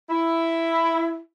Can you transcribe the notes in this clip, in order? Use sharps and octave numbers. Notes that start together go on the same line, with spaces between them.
E4